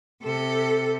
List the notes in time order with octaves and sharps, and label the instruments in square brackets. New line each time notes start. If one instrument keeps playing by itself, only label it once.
[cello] C3 A4